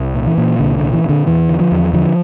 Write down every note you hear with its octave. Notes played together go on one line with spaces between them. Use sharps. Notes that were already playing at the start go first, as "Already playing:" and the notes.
Already playing: C2
A#2
E3
A#2
C2 D3
D3
A#2
E3
A#2 D3
E2 E3
D3
F3
E2
D3 F3